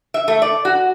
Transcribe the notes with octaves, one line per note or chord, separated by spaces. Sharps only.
E5
A3
D5
F#4